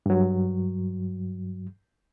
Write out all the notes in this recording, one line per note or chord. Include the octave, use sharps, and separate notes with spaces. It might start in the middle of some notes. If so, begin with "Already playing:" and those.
G2 F#3